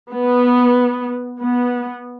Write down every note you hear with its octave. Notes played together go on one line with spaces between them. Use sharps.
B3
B3